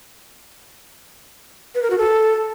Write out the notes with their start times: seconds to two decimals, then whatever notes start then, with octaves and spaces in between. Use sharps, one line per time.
1.75 B4
1.83 A#4
1.90 F#4
1.98 A4